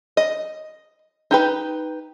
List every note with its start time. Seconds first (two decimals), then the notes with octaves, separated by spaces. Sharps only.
0.17 D#5
1.31 D#4 G4 B4